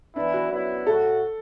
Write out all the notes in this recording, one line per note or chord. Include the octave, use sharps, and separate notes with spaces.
E3 B3 D4 E4
F#4
F#2 F#3 B3 E4
A2 A3 F#4 A4